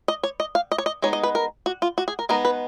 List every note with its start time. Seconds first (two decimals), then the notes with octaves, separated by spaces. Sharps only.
0.08 D#5
0.23 C#5
0.40 D#5
0.55 F5
0.72 D#5
0.78 C#5
0.86 D#5
1.02 G#3 B3 D#4 C#5
1.13 D#5
1.23 B4
1.35 A#4
1.66 F#4
1.82 F4
1.98 F#4
2.08 G#4
2.19 A#4
2.29 G#3 B3 D#4 A#4
2.45 B4